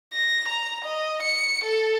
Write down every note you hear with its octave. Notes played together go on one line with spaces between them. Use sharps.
A#6
A#5
D#5
C#7
A4